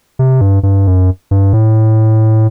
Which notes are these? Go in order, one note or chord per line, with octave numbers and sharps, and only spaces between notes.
C3
G2
G2
F#2
G2
A2